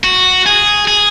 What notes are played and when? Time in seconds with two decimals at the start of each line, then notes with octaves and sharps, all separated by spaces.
0.04 F#4
0.46 G#4
0.88 G#4